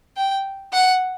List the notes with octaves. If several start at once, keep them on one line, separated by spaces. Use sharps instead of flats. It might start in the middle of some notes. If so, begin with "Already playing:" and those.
G5
F#5